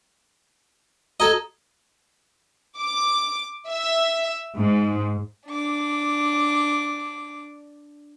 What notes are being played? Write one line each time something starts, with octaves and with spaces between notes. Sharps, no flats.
F#4 A4 D#5 A#5 G#6
D6
E5
G#2
D4 D6